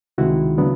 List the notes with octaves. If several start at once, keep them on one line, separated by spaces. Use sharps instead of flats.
C#2 C3 D#3 G#3 E4 F#4
C#3 F#3 B3 D4